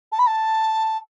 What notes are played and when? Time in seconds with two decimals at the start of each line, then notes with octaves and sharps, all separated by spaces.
0.12 A5
0.19 B5
0.27 A5